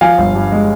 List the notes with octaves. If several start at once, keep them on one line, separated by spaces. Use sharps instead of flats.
F3 F5 G#5
G1
G2
G#3